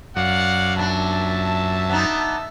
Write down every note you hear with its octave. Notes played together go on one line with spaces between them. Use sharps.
F#2 D5 F5 F#5
A#2 D4 E5 A5
B3 D4 D#4